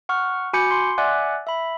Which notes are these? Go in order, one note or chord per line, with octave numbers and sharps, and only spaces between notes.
F#5 C#6 F6
F#4 G#5 B5 D6 G6 C#7
C6
D5 E5 F#5 G#5 D6 F#6
E5 B5